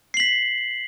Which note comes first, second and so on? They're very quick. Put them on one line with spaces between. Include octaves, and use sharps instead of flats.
C7 F#7 B6